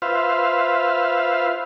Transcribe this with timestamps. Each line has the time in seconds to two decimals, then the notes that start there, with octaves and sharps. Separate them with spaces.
0.02 F4 B4 C5 E5 F5